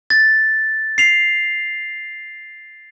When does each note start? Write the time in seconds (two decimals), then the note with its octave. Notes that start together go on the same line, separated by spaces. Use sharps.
0.10 A6
0.98 C7 F7